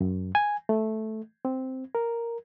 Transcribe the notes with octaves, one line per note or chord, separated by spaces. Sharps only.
F#2
G#5
A3
C4
A#4